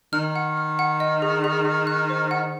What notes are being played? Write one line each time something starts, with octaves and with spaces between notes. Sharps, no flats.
D#3 F6
F#5
F6
F#5
D#5
G#4
G#4
G#4
F#6
C5
F#5